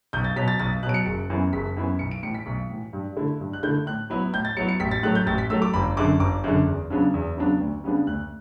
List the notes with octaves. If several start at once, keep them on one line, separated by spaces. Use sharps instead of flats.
B1 G6
A6
B2 F#3 B6
A6
B1 A6
B2 F#3 F#6 D7
C#7
F#1 C#7
F#2 E3 B3 E4
F#1 B6
F#2 E3 B3 E4
B1 C#7
D7
A2 E3 C#7
B6
B1
A2 E3
G2
D3 A3 E4
G2
F#6
D3 A3 E4 G6
A2 F#6
F#3 B3 E4
A2 G6
A6
F#3 B3 E4 C#7
C#7
A1 B6
A6
A2 F#3 A3 F#6
G6
A1 A6
B6
A2 F#3 A3 E6
D6
G1 B5
F#2 D3 D6
G1 D6
F#2 D3
E2
C#3 F#3 B3 D4
E2
C#3 F#3 B3 D4
D2
C#3 G3 B3 D4
D2 F#6